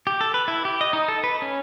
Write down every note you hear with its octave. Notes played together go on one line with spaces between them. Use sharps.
G4
A4
B4
E4
G4
D#5
D#4
A4
B4
C#4